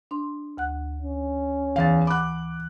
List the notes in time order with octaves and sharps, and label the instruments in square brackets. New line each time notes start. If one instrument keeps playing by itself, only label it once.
[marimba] D4 C6
D2 F#5 F#6
[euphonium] C#4
[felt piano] E2 F5 [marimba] E3 G#5 A6
[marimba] F#5 B5 [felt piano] D6 F#6